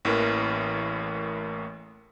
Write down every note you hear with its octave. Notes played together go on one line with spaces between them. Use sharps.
A1 A2 E3 A#3 A#4